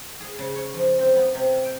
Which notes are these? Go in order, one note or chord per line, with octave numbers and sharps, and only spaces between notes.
G#4
C#3
C#5
F3
C4
B3
C3
G5